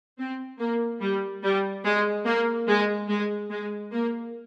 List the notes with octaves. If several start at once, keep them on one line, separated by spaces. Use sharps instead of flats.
C4
A#3
G3
G3
G#3
A#3
G#3
G#3
G#3
A#3